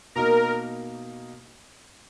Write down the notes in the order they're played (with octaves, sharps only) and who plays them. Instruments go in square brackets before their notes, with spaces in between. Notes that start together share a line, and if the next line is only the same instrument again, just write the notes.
[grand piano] B2 A#3 D#4 [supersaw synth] A#4